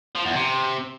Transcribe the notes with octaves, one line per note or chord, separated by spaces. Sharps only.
F3
E2
C3